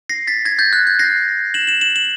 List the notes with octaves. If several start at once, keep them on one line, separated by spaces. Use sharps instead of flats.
A#6 C7
A6 B6
G#6 A#6
G6 A6
F#6 G#6
G6
A#6 C7
E7 F#7
E7 F#7
E7 F#7
E7 F#7